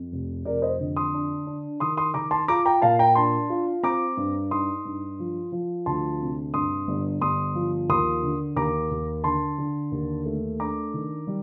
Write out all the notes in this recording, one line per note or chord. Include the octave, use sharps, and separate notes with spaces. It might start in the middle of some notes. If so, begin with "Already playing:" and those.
Already playing: F2
F1
F2 A#4 D5
C5 D#5
D3
C6 D#6
D4
D4
D#3 C6 D#6
C6 D#6
D#3 A#5 D6
A5 C6
F4 A#5 D6
G5 A#5
A#2 F5 A5
G5 A#5
D4 A5 C6
F4
C4 A#5 D6
G2
D#4 C6 D#6
G2
F3
F3
D2 A5 C6
C3
G2 C6 D#6
G1
G1 C6 D#6
F3
D#2 C6 D#6
D3
D#2 A#5 D6
D#2
D3 A5 C6
D3
D#2
A3
D4 A#5 D6
D#3
G3